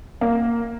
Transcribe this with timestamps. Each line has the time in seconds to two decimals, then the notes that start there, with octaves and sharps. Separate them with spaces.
0.21 A#3